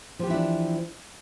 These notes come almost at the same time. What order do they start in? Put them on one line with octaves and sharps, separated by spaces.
F3 G4 E3 E4 D4